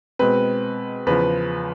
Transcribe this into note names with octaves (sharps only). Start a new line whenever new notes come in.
B2 G#3 C4 B4
E2 C#3 F3 B4